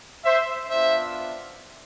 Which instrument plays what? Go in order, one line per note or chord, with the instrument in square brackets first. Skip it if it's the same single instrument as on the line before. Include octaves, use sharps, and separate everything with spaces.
[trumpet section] C5 E5
B3 D4 F4 C5 E5